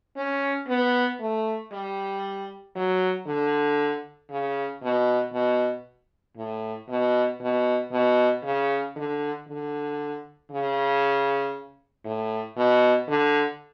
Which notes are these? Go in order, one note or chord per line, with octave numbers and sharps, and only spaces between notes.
C#4
B3
A3
G3
F#3
D3
C#3
B2
B2
A2
B2
B2
B2
C#3
D3
D3
C#3
A2
B2
D3